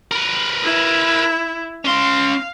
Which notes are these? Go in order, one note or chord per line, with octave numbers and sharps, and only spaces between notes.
A#4 B4
E4
C#4 F5 C6